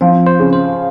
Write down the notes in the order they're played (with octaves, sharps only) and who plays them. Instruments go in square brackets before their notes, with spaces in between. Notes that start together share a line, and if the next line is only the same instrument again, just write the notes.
[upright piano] F3 [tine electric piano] C4
[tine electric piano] C5
[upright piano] C#3
[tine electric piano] C5